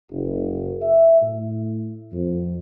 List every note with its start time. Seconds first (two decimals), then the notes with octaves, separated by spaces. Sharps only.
0.11 F#1
0.82 E5
1.22 A2
2.13 F2